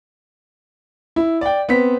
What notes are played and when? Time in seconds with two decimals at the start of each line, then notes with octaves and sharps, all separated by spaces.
1.16 E4
1.41 D5 G5
1.69 B3 C4 B6